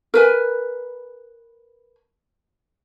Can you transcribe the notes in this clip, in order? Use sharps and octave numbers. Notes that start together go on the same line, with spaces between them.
A#4 B4 G#5